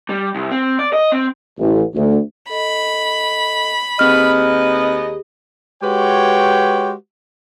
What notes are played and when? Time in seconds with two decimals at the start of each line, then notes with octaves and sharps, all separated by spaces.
0.09 G3
0.35 C2
0.51 C4
0.79 D5
0.93 D#5
1.12 C4
1.59 A1
1.95 D2
2.50 A4 D#5 B5
3.99 D#2 C4 G4 G#4 B4 D#5 F6
5.83 G#3 F#4 G4 B4 C#5 G5